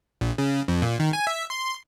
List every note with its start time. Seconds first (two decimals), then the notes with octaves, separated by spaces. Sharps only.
0.21 A#1
0.38 C#3
0.68 F2
0.82 A#2
0.99 D#3
1.13 G#5
1.27 E5
1.50 C6